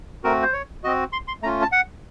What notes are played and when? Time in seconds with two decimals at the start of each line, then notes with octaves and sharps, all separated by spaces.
0.24 A3 C4 F#4 A#4
0.42 C5
0.53 C#5
0.83 C4 F#4 D#5
1.13 C6
1.28 C6
1.42 A3 C#4 F4 A#5
1.62 A5
1.72 F#5